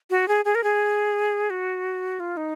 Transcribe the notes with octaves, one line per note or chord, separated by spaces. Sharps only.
F#4
G#4
G#4
A#4
G#4
F#4
F4
D#4